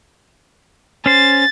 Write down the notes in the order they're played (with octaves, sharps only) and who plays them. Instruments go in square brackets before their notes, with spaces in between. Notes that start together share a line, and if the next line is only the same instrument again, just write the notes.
[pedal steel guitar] C#4 C5 [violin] A6